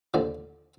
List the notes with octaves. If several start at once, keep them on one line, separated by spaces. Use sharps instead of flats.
D#2 D3 F3 D5